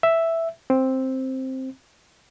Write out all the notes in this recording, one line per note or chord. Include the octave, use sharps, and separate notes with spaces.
E5
C4